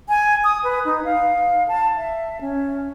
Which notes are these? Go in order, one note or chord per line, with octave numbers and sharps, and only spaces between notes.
G#5
D#6
B4
D#4
F5
A5
E5
C#4